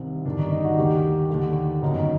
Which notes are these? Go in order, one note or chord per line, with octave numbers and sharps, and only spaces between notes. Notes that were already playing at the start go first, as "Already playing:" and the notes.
Already playing: C2 C3 D#3 C4
G1 G2 D#3 D4
D#4
D#4
F#4
D#2 D#3 G4
D#2 D3
G1 F#2 D#3 D#4